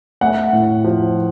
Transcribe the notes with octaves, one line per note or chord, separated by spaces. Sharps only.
A3 F#5
A2
F3